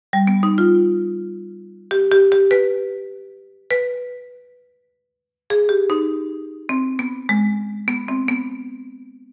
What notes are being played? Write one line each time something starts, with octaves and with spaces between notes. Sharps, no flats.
G3
B3
D#4
F4
G4
G4
G4
B4
B4
G#4
G4
D#4
C4
B3
G#3
B3
C4
B3